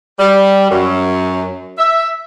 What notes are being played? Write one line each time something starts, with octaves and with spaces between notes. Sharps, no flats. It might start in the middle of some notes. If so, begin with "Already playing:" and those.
G3
F#2
E5